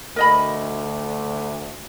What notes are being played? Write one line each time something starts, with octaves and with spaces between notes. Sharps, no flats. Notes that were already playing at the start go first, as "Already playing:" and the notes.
D2 A#4 D#5 B5